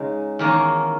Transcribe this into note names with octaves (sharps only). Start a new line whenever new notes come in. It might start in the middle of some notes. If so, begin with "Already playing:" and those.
Already playing: C#3 G#3 D#4
E2 D#3 A#3 C#4